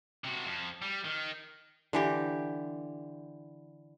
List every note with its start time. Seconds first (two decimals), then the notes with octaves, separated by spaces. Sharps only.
0.24 C3 F#4
0.45 F2
0.82 G3
1.05 D#3
1.93 D3 E3 G4